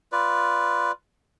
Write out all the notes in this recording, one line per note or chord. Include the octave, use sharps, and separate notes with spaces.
F4 B4 D5